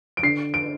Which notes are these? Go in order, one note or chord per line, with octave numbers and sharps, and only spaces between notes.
D7
D3 C7
D7